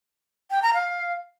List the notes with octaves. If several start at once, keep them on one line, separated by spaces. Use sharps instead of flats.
G5
A#5
F5